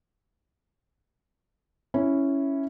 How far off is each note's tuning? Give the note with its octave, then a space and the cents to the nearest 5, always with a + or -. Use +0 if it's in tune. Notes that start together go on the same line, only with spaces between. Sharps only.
C#4 +0 E4 +0